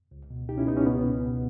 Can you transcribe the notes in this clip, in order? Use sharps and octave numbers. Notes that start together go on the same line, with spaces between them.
C#2
B2
C#2 D#4 G4
C#4 E4
B2 B3 D#4
C#4
C#2 B3
B2
C#2